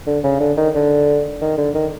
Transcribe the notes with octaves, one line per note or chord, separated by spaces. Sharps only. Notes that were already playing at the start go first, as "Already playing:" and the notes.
D3
C#3
D3
D#3
D3
D#3
D3
D#3